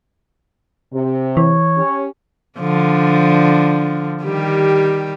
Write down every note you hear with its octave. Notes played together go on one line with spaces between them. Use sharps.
C3
E3 C#5
C#4 G4
D3 F3 D4
D#3 G3 G4